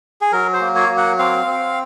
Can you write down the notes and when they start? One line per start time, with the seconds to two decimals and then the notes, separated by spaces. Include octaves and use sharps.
0.21 G#4
0.32 F#3 A#4
0.53 C5
0.61 A#3
0.76 C#5
0.89 F#3
0.97 F#5
1.19 C4 F5
1.46 C4